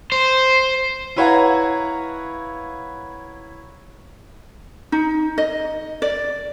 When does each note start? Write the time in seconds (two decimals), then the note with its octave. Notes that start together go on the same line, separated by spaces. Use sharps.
0.12 C5
1.16 E4 B4 C#5 F5 F#5 A#5
4.92 D#4
5.38 D#5
6.02 D5